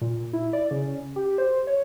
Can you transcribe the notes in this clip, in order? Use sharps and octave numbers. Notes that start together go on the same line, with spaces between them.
A#2
E4
D5
C#3
G4
C5
C#5